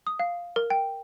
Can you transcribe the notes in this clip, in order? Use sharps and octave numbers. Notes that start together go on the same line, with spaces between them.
D#6
F5
A#4
G5